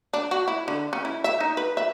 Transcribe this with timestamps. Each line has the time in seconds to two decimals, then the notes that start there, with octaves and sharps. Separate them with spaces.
0.14 D4
0.31 F#4
0.48 E4
0.68 D3
0.93 C#4
1.05 E4
1.24 E5
1.40 D#4
1.57 B4
1.77 E5